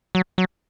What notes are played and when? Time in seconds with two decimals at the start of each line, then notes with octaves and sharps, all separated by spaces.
0.15 F#3
0.38 F#3